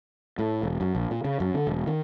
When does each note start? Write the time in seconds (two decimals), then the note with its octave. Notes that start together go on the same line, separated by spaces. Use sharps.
0.39 A2
0.63 E1
0.81 F#2
0.95 A#1
1.11 A#2
1.25 C#3
1.40 F#2
1.54 D3
1.67 E1
1.87 D#3